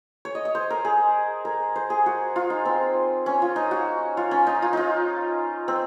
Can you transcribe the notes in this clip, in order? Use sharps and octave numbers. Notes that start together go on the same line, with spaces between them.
C#5
D#5
D#5
C5
A#4
G#4
A#4
C5
G#4
F#4
F4
D#4
C4
C#4
F4
D#4
F#4
F4
C#4
D#4
F4
D#4 F4
C4